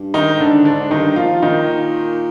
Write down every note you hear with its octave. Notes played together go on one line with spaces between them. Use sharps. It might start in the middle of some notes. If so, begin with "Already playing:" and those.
Already playing: G2
D#3 D#4
G#2
D3 D4
G#2 D3 D4
G2 D#3 D#4
A#2 F3 F4
D#3 D#4